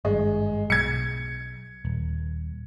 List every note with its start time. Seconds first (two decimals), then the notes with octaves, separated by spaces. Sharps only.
0.05 G#1 G2 G#3
0.70 B1 G#6 C#7
1.85 D#1